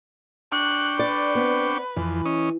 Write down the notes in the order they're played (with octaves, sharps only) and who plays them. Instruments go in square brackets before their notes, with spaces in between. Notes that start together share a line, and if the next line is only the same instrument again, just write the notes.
[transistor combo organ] D4 G5 C#6 [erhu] F#6
[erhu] B4 [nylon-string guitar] D5
[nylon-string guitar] B3 C4
[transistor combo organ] F2 [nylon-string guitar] E3
[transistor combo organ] C#4 D#5